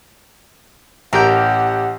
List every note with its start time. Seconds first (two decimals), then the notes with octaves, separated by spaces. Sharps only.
1.13 A1 G4 A#4 F#5 G6